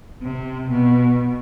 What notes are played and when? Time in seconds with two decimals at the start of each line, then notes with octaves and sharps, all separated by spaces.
0.22 C3
0.69 B2